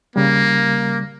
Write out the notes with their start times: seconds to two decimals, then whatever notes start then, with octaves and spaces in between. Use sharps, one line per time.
0.16 C#3 G3 A#3